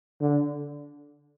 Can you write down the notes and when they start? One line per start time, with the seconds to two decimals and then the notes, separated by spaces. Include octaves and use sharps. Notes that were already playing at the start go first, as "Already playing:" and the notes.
0.21 D3